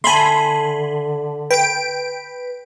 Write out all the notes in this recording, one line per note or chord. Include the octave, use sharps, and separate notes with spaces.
D3 E5 G#5 A5 B5 C6
B4 G5 D7